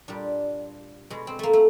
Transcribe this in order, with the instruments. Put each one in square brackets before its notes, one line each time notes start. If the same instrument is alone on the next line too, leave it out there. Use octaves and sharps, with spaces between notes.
[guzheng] A#2 G3 D4
B2 G#3
C4
A3 A#3
A3